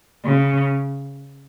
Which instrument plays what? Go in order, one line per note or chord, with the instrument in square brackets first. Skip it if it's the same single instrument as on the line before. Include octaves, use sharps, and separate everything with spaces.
[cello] C#3